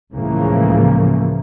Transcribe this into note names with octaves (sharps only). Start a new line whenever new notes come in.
C#2 A2 C#3 E3 F3 A#3